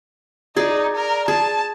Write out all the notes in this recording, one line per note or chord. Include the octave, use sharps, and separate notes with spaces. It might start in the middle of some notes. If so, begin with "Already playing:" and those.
D#4 G#4 D5
A#4
G#4 A5